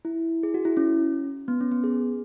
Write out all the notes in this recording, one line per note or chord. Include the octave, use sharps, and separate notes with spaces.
E4
G#4
F#4
E4
C#4
B3
C#4
B3
G#4